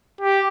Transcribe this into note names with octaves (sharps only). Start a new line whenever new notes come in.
G4